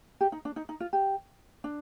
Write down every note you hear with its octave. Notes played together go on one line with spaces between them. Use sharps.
G4
D#4
D4
D#4
D#4
F4
G4
D4